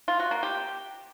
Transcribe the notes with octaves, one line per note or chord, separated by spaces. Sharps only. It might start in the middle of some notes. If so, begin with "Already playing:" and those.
F4
F#4
A#3
G4